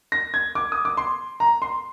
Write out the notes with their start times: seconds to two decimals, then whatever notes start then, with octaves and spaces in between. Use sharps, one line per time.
0.12 A#6
0.34 G#6
0.55 D6
0.72 D#6
0.85 D6
0.97 C6
1.40 A#5
1.62 C6